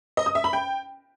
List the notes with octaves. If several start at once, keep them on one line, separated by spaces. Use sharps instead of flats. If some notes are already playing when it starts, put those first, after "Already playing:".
D#5
D#6
E5
B5
G5